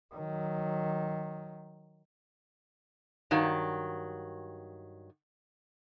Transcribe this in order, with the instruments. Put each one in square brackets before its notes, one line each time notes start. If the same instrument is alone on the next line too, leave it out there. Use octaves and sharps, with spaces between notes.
[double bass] D#3 F#3
[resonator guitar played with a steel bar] G2 D#3 F#3